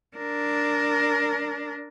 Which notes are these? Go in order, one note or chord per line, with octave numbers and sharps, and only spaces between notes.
D4 A#4